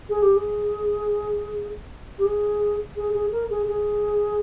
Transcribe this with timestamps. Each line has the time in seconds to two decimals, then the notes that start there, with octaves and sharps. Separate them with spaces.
0.09 G#4
0.22 G4
0.35 G#4
2.18 G4
2.24 G#4
2.96 G#4
3.13 G#4
3.31 A#4
3.49 G#4
3.67 G#4